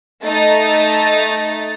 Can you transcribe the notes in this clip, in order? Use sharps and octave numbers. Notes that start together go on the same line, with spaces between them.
A3 D#4 A6